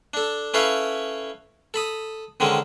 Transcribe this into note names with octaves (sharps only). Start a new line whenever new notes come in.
D4 A4
C#4 E4 A4 B4 C#5 F5
A4 B5 D#6
D3 D#3 G#3 C4 C#4